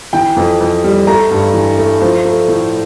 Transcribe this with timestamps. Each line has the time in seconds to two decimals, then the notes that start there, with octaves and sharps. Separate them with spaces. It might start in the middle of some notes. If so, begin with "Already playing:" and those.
0.13 E3 G5
0.36 F2
0.60 F2
0.84 G3
1.07 A3 A#5
1.31 G2
1.54 E3
1.78 A3
2.01 F3
2.25 A3
2.48 A2